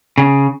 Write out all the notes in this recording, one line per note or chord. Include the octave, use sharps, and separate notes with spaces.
C#3